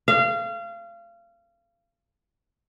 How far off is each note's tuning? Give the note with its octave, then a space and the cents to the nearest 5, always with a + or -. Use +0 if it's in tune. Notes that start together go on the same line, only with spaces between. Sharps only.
F5 -30